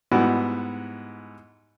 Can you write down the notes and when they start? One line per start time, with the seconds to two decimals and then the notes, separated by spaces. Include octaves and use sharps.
0.12 G#2 G3 B3 E4 F#4